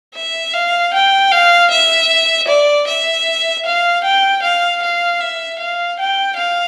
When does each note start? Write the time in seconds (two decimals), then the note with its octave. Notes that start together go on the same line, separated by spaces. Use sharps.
0.15 E5
0.53 F5
0.93 G5
1.31 F5
1.71 E5
2.48 D5
2.87 E5
3.66 F5
4.04 G5
4.42 F5
4.82 F5
5.21 E5
5.59 F5
5.99 G5
6.37 F5